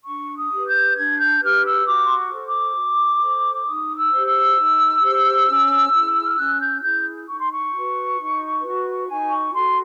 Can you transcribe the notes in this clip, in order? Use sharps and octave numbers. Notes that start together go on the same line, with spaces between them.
D4 C#6
D#6
G4 B4
G6
D4 G#6
G6
G4 B4 F6
E6
F#4 D6
C6
C#6
A4 C5
D6
F#4
A4 C5
D#4 D#6
E6
G4 C5
E6
D#4
G4 C5
C#4
E4 G#4
F6
C#4 F#6
G6
E4 G#4 G6
D#4 C#6
C6
C#6
F#4 B4
D#4
F#4 B4
D#4 G#5
C#6
F#4 A4 C6